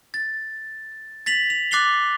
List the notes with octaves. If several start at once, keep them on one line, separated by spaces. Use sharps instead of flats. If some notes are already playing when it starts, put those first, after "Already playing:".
A6
A6 B6 F7 F#7
F7
D6 F#6 A6 C7 F7 G7